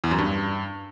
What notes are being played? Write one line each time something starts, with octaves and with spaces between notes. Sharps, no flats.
E2
F#2
G2